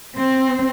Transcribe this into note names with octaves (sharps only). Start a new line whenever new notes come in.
C4